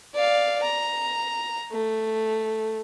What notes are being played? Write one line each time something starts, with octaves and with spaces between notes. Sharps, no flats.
D5 F5
A#5
A3